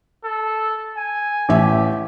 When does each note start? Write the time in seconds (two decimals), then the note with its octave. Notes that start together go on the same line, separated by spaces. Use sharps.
0.25 A4
0.97 G#5
1.49 A1 G4 E5